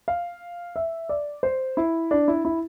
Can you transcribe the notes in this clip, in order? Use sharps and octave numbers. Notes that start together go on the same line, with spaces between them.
F5
E5
D5
C5
E4
D4
E4
E4